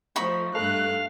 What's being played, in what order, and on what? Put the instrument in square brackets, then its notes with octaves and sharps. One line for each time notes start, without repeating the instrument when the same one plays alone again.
[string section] F3 A3 [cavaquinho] D#4 B5 C#6
[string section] G2 A3 F#6 [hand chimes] A4 A5 [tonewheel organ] F5